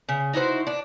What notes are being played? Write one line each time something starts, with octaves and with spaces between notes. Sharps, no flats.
C#3
D#4 E4 F#4 C5
D4